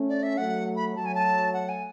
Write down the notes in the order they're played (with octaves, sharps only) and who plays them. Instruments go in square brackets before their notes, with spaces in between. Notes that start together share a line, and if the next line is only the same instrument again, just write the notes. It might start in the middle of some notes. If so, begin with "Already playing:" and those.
Already playing: [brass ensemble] A3 C#4
[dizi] D5
E5
[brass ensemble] F#3 A3 [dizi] F#5
[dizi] B5
[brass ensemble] F#3 A3 [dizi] A5
[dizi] G#5
A5
F#5
G#5